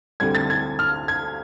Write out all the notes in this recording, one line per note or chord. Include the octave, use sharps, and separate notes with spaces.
D2 D3 G3 C4 G#6
A6
G#6
F6
G#6